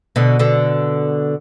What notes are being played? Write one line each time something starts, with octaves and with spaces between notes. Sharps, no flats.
B2 D3
B2 D3